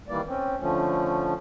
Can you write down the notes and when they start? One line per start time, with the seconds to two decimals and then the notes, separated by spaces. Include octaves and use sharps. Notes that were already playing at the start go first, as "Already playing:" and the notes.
0.09 D#3 E3 G3 A#3 D5
0.27 C4 C#4
0.60 D3 F3 A3 C#4